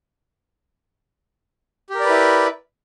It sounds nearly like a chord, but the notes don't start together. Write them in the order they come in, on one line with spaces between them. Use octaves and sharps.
G4 A#4 D5 B4 E4